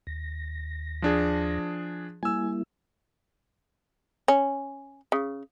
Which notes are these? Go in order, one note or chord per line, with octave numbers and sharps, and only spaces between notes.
D#2 A#6
F3 D4 G#4
G3 A#3 E4 G#5 E6
C#4
C#3